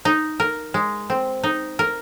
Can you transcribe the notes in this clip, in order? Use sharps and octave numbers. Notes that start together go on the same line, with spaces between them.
D#4
A#4
G#3
C4
D#4
A#4